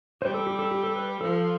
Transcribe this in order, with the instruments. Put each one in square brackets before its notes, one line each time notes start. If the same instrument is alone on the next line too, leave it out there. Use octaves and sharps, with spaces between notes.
[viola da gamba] G3 [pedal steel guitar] C5
[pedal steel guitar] A4
G4
A4
G4
A4
B4
[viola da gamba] F3 [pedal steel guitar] A4